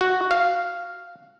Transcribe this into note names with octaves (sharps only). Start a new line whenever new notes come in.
F#4
F5